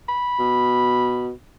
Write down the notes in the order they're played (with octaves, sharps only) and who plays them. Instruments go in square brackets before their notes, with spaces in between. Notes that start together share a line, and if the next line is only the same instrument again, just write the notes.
[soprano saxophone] B5
[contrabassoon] B2